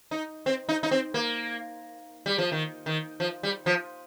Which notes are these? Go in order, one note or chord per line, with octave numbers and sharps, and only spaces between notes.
D#4
C4
D#4
D#4
C4
A#3
G3
F3
D#3
D#3
F3
G3
F3